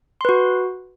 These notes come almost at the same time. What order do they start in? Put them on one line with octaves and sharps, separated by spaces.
C6 B4 F#4